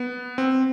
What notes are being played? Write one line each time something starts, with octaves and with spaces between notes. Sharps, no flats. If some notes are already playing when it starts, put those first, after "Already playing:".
Already playing: B3
C4